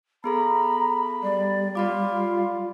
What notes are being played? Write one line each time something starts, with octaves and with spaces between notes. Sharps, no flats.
B3 G#4 A4 A#5 B5
G3 D5
F4 D5 F5 B5 D6